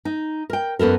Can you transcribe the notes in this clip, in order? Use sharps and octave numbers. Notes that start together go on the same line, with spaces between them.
D#4
A#4 G5
F#2 B3 A4 A#4